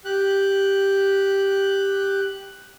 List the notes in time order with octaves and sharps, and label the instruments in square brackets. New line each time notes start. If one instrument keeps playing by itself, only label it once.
[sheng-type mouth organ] G4 F#6